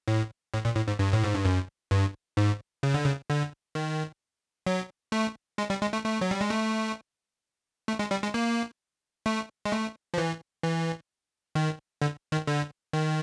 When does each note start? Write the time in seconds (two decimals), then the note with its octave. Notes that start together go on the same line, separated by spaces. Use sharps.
0.08 A2
0.54 A2
0.65 A#2
0.76 A2
0.88 G#2
0.99 G2
1.13 A2
1.24 G#2
1.35 G2
1.45 F#2
1.91 G2
2.37 G#2
2.83 C#3
2.94 D3
3.05 C#3
3.29 D3
3.75 D#3
4.67 F#3
5.12 A3
5.58 G#3
5.70 G3
5.81 G#3
5.93 A3
6.05 A3
6.21 F#3
6.31 G3
6.41 G#3
6.50 A3
7.88 A3
7.99 G#3
8.11 G3
8.23 G#3
8.34 A#3
9.26 A3
9.65 G#3
9.72 A3
10.14 F3
10.18 E3
10.63 E3
11.55 D#3
12.02 D3
12.32 D#3
12.47 D3
12.93 D#3